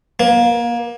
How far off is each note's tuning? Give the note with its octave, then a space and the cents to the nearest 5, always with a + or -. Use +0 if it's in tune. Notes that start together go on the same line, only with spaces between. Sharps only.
A#3 +25